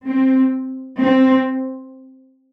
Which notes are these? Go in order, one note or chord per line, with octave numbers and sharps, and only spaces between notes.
C4
C4